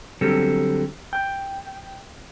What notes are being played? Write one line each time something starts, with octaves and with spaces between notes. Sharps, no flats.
D3 F#3 G3 C4 G4 A4
G5